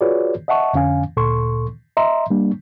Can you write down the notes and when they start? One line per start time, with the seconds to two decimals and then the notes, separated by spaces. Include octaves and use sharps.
0.01 F4 F#4 G#4 B4 C#5 D5
0.48 D#5 E5 F#5 A5 C#6
0.74 F2 D3 C#4 F5 G#5
1.17 D2 A#2 A4 C6 C#6
1.97 D#5 E5 A#5 C6
2.30 G3 A#3 D4